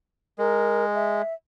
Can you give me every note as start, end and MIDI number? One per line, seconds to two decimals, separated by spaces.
0.39 1.22 56
0.39 0.85 70
0.95 1.33 76